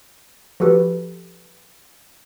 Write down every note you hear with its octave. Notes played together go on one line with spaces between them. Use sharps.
F3 F#4 G4 A4 B4